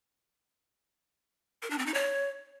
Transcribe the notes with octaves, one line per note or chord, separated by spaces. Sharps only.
A#4
D4
C4
D#4
C#5